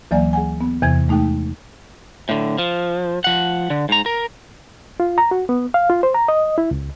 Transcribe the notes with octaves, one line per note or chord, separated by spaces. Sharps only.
D2 E3 F#3 A#3 D5 G#5
G#4 F#5 G#5
B3
E2 C3 E3 G#6
G#3 A3 D#4 G#4 G5
A2 D3
F3
F3 F#5
D3
G#2 A#5
A#4
F4
A#5
F#4
B3
F5
F4
C5
A#5
D#5
E4
C#2